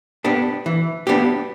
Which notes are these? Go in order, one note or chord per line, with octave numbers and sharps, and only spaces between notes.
B3 D4 G4
E3
B3 D4 G4